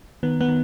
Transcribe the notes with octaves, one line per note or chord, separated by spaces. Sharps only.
D#3 B3
B3
D#3